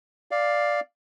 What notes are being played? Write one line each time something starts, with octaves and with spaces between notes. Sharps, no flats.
D5 F5